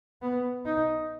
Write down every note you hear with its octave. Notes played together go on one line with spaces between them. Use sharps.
B3
D#4